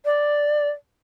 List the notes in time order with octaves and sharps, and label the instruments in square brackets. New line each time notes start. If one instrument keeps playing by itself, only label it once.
[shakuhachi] D5